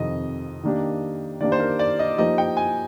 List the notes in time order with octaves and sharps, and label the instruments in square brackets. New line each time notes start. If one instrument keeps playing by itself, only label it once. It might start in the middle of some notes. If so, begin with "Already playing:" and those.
Already playing: [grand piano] F2 C3 D#3 [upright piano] D#5
[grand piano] D#3 A#3 D4 G4
[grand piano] D#3 A#3 D4 G4 [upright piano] D5
[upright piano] C5
A#4
D5
D#5
[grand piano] F3 A#3 D#4 G4 C5 [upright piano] D#5
[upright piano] G5
G#5